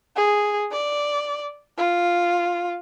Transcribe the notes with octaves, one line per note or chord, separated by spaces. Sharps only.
G#4
D5
F4